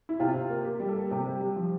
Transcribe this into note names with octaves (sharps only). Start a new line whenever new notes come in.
E4
C3 F4
C3
A#3
A#3 G4
G3
A4
A#3
C3 G4
G3
G3
F3